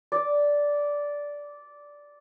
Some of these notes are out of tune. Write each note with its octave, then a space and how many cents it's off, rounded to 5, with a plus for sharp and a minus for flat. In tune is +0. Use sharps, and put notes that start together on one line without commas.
D5 -10